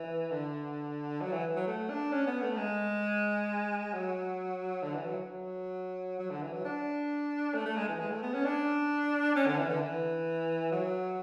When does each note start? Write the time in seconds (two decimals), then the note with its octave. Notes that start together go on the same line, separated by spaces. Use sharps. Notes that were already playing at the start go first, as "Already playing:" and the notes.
Already playing: E3
0.31 D3
1.21 F#3
1.32 E3
1.56 F#3
1.67 A3
1.90 D4
2.12 C#4
2.27 B3
2.42 A3
2.58 G#3
3.93 F#3
4.83 D3
4.94 E3
5.06 F#3
5.29 F#3
6.19 F#3
6.30 D3
6.42 E3
6.53 F#3
6.65 D4
7.54 A3
7.66 A3
7.77 G#3
7.88 E3
7.99 G#3
8.11 A3
8.23 B3
8.34 C#4
8.45 D4
9.36 C#4
9.47 D3
9.58 E3
9.69 D3
9.81 E3
10.72 F#3